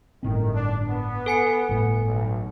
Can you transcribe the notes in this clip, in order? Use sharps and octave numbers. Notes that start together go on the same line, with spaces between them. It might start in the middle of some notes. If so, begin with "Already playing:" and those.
G1 A2 D#3 C4
D4
B3
A4 G#5 C#7
G1 A2
B1